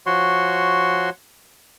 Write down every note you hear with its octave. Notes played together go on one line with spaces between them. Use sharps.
F3 F#4 C#5 C6